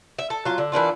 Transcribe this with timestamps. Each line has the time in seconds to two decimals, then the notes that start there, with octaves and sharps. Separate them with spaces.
0.19 E5
0.30 A4
0.45 F#3 F4
0.58 D3
0.72 E3 A#3 D4 F4